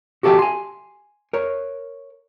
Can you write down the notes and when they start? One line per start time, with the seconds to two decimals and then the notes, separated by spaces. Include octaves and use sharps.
0.23 F#4 G4 A4 D5 E5 G5
0.39 G#5 C6
1.33 A#4 C#5